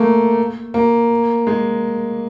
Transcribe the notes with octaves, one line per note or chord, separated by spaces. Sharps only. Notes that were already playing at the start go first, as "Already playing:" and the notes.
Already playing: A3 A#3
A#3
G#3